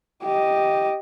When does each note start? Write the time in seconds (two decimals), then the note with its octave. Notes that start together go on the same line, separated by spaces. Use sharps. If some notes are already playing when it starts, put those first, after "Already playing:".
0.24 G4 D#5